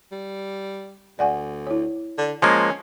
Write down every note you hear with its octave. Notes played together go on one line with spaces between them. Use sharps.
G3
D2 D5 F#5 G#5
E4 C#5
D3
F3 G#3 A#3 C#4